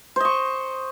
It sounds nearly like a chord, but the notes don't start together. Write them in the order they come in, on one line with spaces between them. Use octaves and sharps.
C5 D#5 C#6